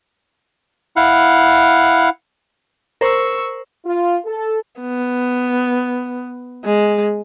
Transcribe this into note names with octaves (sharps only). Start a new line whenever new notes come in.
E4 F5 F#5
A#4 C5 C#6 E6
F4
A4
B3
G#3